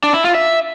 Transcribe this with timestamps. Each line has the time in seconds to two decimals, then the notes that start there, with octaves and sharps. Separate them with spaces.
0.04 D4
0.14 E4
0.24 F4
0.35 E5